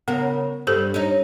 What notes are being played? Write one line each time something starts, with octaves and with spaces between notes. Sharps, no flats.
C#3 B3 A#4
G2 G4 A4 C5
C#4 D#4